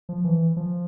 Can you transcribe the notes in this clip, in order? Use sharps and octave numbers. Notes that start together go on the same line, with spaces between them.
F3
E3
F3